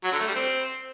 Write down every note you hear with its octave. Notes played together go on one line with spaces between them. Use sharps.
F#3
D3
A3
G3
C4